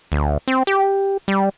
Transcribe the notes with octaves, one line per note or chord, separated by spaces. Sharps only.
D2
C4
G4
G3